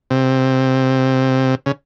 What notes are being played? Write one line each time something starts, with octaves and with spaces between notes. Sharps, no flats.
C3
C#3